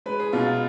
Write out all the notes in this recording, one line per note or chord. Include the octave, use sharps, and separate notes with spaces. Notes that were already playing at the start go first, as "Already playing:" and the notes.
G#3 B4
G#4
B2 F4
F4